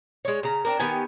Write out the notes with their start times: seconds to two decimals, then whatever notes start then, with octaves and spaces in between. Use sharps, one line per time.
0.25 G#3 C#5
0.43 C#3 A#5
0.65 C4 D4 A#4
0.79 D#3 B3 G4 G#5